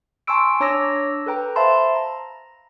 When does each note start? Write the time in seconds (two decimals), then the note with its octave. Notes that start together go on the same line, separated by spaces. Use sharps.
0.27 G#5 A5 C6 C#6 E6 D7
0.60 D4 C#5 A#5 D6 E6 A#6
1.26 A4 B4 G5 A#5
1.56 C5 E5 F5 A5 B5 C6
1.95 A#5